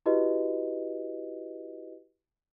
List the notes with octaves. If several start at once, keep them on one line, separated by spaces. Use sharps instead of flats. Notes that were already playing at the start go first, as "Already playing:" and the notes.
E4 F#4 G4 B4 D#5